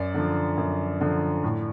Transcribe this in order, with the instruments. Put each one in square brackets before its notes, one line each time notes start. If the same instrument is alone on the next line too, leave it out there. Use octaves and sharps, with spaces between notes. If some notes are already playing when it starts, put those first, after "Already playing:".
Already playing: [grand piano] F#2 D5
D3 F3
F#2
D3 F3
A2